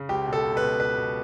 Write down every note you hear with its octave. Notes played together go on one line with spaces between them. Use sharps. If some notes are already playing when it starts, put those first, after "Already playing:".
Already playing: C#3
C#2 G4
B2
A4
C#2
B4
B2
C#2 B4
B2